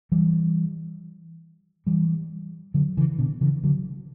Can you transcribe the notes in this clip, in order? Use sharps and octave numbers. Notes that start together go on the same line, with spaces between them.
E3 G3
E3 G3
D3 F#3
C#3 E3
B2 D3
C#3 E3
D3 F#3